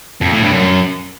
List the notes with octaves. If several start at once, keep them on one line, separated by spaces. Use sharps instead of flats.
F2
A2
G2
F#2